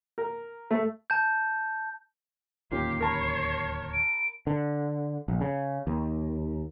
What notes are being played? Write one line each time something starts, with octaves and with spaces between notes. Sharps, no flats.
A#4
A3
A5 G6
D1 D#2 A#3 C#4 F4 G4 C7
A#4 C#5 A5 B5
D7
D3
A#1
C#3
D#2